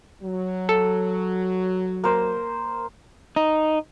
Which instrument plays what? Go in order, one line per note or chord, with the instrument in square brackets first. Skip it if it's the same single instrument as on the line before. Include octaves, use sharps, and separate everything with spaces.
[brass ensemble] F#3
[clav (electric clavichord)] A4
[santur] A#3 C5
[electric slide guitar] D#4